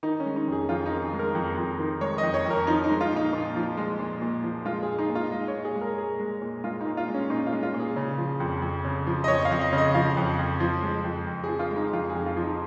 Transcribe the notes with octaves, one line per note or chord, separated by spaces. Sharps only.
D#3 D#4
C#4
G#3
D#4
F2
G#4
F2 F4
D#4
D#3
G#4
G#3
A#4
F2
F2
D#3
G#3 C#5
D#5
F2
C#5
F2
A#4
F3 D#4
D#4
G#3
F4
A#2 D#4
A#2 D#4
F3
G#3
A#2
A#2
F3
G#3 F4
G#4
A#2
D#4
A#2
F4
G#3 D#5
C#5
A#2
G#4
G#3
A#4
A#2 G#4
G#3
A#2
G#3 F4
D#4
A#2
F4
G#3
C#4
A#2 D#4
F4
G#3
F4
A#2
G#4
C#3
F3
F2
F2
C#3
F3
D#5
F2 C#5
F5
F2
D#5
C#3
D#5
F3 F5
F2
F2
F3
G#3
F2
F2
G#4
F3
F4
G#3
D#4
F2 F4
G#4
F2
F4
F3
D#4